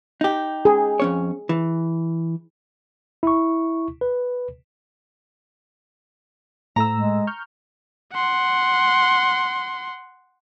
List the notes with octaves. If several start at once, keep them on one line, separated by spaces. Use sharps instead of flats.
D#4 G4
G#4
F2 C#4 C#5
E3
E4 C#6
B4
A2 A3 A#5 E6
G#3
C#6 F6 G6
F#5 C6